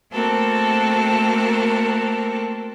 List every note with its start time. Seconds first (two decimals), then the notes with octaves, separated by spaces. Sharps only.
0.11 A3 A#3 C4 F#4 A4 A#4